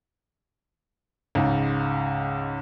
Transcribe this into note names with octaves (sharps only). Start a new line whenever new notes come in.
C#2 G#2